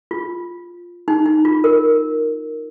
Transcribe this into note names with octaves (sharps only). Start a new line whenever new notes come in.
F4
D#4
D#4
F4
A#4